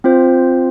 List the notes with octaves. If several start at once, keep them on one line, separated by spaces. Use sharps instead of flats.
C4 F4 C5